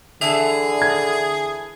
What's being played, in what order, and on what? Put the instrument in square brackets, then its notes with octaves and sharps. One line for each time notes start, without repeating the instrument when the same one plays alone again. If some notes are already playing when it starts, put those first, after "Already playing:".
[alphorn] D3 [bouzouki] E3 A4 E5 [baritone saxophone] G#4
[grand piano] G#6